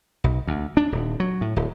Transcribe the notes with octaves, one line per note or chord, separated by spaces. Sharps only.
B1
D2
D4
D#1
F#3
A2
D1